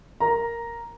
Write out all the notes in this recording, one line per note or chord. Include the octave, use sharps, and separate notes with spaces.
A#4 A#5